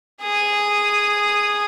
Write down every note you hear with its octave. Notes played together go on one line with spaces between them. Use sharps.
G#4 D#6